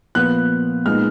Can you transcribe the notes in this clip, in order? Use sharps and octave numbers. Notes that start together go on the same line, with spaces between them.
A#2 F3 B3 F4 F#6
A#2 G#3 B3 D#4 F6